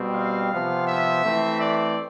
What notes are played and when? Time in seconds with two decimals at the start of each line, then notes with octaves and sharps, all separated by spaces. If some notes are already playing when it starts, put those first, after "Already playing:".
Already playing: B2 G3 C4
0.14 F5
0.52 C3 F3 B3
0.87 E5
1.23 E3 A3 C4
1.61 D5